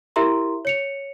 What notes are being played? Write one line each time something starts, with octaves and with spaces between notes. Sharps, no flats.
E4 G4 A#4 E5 A#5 C6
C#5 C#7 F7